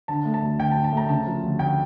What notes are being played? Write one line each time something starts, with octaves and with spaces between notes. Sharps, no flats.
D3 A5
A3
A5
D2
D2 G5
A5
D3
A5
A3 A#5
C#3 A5
F3
D2
D2 G5